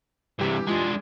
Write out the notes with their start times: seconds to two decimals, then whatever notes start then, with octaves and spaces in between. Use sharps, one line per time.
0.39 G2 C3 E3 G4 G5
0.67 G#3 D4 F4